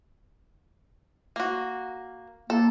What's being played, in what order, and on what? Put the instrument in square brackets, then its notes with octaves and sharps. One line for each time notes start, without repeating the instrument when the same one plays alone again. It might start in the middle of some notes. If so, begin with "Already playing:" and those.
[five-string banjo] A#3 F#4
[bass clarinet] A#3 [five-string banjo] A4